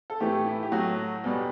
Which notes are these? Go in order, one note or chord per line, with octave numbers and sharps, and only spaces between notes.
A4
A2 E3 A3 G4
E4
G4
A2 F#3 A3 F#4
E2 B2 G3